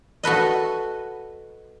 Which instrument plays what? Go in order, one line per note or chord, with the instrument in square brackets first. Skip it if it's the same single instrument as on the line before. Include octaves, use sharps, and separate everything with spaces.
[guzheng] F#4 A4 B4 D#5